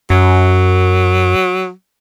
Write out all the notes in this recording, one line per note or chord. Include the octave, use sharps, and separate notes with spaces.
F#2 F#3